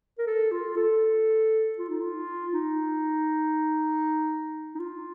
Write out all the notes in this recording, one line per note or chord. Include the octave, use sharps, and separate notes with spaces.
A#4
A4
F4
A4
F4
D#4
F4
D#4
D#4
F4